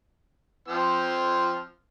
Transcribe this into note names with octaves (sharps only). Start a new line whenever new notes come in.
F3 C4 F6